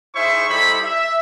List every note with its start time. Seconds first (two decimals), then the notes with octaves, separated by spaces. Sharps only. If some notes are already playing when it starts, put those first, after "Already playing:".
0.15 D#4 E4 G#4 C5 E5 C#6
0.49 G3 D#4 E4 A4 C5 B5
0.84 E5